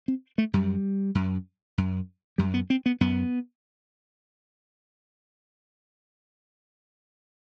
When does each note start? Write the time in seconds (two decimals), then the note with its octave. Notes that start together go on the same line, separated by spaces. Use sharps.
0.08 C4
0.38 A3
0.53 F#2 G3
1.15 F#2
1.78 F#2
2.38 F#2 G3
2.54 B3
2.70 C4
2.86 B3
3.01 F#2 B3